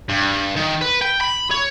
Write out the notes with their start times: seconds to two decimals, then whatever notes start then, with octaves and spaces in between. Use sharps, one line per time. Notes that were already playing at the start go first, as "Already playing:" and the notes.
0.09 G2
0.56 D#3
0.82 B4
1.02 G5
1.21 B5
1.51 C#5